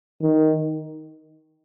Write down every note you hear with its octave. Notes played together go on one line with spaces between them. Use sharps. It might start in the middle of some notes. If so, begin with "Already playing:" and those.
D#3